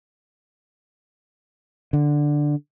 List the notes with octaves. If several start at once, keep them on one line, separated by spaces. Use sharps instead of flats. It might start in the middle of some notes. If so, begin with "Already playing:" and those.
D3